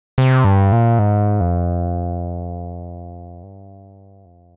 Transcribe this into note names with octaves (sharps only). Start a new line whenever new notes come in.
C3
G2
A#2
G#2
F2
G2
F2